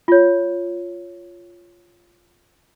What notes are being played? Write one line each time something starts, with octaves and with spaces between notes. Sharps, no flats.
F4 C#5